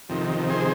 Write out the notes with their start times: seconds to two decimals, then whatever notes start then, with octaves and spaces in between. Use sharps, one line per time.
0.09 F2 C3 D#3
0.50 G#4 C5